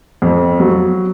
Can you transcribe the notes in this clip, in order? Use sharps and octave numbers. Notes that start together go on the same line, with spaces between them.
F2
F#3